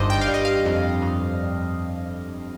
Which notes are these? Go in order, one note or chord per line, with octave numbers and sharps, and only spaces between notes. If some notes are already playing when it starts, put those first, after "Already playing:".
Already playing: G1 G2 D#3 G3 C5 D5 D#5
G5
F5
G3
D#5
F5
F2
F2